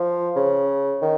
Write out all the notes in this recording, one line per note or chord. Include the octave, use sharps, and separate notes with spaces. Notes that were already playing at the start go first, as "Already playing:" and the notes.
Already playing: F3
C#3
D#3